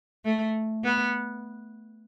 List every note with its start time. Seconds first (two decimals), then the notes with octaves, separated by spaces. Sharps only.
0.25 A3
0.84 B3